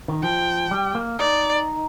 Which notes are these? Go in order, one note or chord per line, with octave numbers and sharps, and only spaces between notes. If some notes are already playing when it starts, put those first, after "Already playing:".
D#3
F3 G5
G3
A#3
D#4 D5